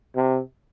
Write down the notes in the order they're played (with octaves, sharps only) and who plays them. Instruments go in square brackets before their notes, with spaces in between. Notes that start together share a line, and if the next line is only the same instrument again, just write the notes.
[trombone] C3